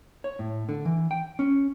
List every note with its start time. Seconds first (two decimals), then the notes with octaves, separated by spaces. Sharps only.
0.24 C#5
0.39 A2
0.69 D3
0.85 E3
1.11 G5
1.39 C#4